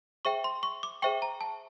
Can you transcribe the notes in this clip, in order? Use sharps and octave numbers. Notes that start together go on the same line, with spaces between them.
G#4 C5 E5 G5 C#6
C6
C#6
D6
G#4 C5 E5 G5 C#6
A#5
A5